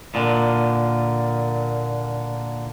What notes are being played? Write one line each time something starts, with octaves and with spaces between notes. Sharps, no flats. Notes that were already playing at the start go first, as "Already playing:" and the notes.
A#2 D3